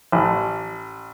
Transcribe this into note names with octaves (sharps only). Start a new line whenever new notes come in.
A1